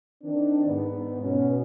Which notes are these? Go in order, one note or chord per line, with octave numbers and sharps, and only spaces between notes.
D#3 C4 D4
G#2 B3
B2 B3 C#4